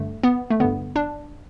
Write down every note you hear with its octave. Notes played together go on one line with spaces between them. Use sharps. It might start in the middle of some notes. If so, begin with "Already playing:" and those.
Already playing: G2 D3 A3
B3
A3
G2 D3 B3
D4